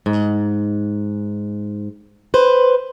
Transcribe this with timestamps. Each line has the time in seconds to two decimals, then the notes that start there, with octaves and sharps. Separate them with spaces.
0.06 G#2
2.34 B4 C5